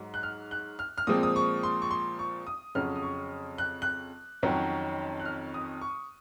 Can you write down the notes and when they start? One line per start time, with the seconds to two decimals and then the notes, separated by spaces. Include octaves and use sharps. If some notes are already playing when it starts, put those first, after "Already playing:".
Already playing: G#2 F#3
0.14 F#6
0.23 F6
0.51 F#6
0.79 F6
0.98 F6
1.07 A#2 F3 G#3 C4 D#6
1.23 D#6
1.36 C#6
1.63 C6
1.82 C#6
1.91 C6
2.19 C#6
2.47 D#6
2.75 F2 C#3 F#3 C#4 F6
2.96 D#6
3.03 C#6
3.58 F#6
3.82 F#6
4.43 F2 D#3 F#3 C#4
5.20 F#6
5.25 F6
5.54 D#6
5.82 C#6